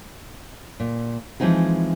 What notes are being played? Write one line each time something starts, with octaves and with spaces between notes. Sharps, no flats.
A#2
E3 F3 G#3 C4 D#4 G#4